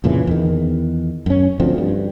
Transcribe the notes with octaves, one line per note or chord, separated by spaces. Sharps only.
F2 A#2 C#3 E3
E2 D#3
F#2 C#4
D2 F3 C4
G2